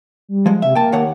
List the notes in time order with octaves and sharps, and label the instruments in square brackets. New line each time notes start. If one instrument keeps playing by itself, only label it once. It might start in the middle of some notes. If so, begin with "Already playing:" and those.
[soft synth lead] G3
[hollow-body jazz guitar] F3 G#3
[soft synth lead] C3 [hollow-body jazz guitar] E5
[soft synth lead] A#3 [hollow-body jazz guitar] G5 A5
[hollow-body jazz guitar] D#2 C#5 F#5